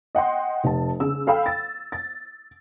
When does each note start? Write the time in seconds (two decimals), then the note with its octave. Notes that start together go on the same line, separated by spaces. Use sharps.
0.15 D#5 F#5 G5 C6
0.64 F1 A5
1.00 C#3 E6
1.27 A4 F5 G5 B5 E6
1.46 A6
1.92 A6